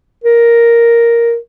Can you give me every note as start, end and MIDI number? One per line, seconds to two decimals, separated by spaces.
0.24 1.37 70